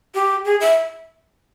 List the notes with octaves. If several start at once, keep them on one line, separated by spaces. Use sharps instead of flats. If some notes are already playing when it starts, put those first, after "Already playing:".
G4
G#4
E5